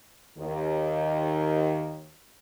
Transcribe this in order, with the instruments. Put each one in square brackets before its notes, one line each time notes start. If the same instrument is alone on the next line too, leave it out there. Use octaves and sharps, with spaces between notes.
[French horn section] D#2 D#3